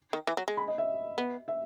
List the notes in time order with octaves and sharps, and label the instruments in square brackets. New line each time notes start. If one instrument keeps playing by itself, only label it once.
[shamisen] D#3
E3
F#3
G#3
[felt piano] B5
D#5
E5
[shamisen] B3
[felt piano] E5